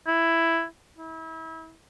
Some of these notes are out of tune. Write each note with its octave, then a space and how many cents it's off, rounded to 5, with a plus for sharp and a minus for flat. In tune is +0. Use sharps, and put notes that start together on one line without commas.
E4 +5
E4 -30